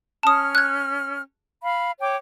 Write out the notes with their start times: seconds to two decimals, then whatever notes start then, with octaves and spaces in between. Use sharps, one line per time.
0.23 C#4 A5 D#6 F6
0.55 F#6 G#6
1.63 F5 B5
1.99 C#5 G5 D6